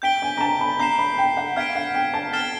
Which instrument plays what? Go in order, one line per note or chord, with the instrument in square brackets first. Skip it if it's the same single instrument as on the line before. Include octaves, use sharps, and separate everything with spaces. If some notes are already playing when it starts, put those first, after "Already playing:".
[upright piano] G5 [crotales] G6 B6 D7 G7
[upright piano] G#5
A#5
A5
B5
[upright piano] A#5 [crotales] G6 C7 E7
[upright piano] B5
G5
F#5
[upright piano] F5 [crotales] F6 G#6 B6 D7
[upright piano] F#5
G5
A5
[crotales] F6 A6 C7 E7 G7